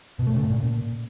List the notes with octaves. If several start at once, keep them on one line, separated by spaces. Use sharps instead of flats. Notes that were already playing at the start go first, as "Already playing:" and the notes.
B2
A3
C#3
A2
A#2